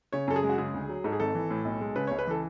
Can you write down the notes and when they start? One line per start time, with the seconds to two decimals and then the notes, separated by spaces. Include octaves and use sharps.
0.12 C#3 C#5
0.27 F#2 A4
0.36 G#4
0.43 G#3
0.49 F#4
0.58 C#3 G#4
0.74 D2
0.89 F#3
1.04 G#2 A4
1.12 G#4
1.20 G#1 A4
1.35 E3
1.51 A2
1.65 B1
1.81 G#3
1.96 C#3 B4
2.07 C#2 C#5
2.19 B4
2.27 E3 A4